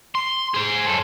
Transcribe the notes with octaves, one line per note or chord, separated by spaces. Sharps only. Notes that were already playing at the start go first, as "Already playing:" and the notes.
C6
G#4 C5
F#2 A4